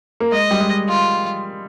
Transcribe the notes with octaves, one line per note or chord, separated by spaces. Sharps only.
A#3
G#3 D#5
G3
G#3
F4